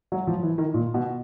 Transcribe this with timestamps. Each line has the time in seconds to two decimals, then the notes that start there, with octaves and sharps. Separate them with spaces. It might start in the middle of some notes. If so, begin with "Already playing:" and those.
0.12 F#3
0.27 F3
0.43 E3
0.58 D#3
0.74 A#2
0.94 B2